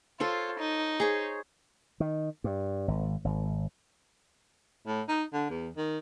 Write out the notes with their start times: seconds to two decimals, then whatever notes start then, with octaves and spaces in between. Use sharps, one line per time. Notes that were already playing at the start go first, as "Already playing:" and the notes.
0.20 F4 A4 C5 C#5
0.59 D#4
1.00 G#4 C5 C#5
2.00 D#3
2.44 G2
2.88 G#1
3.25 G#1
4.87 A2
5.08 D#4
5.33 D3
5.50 E2
5.77 D#3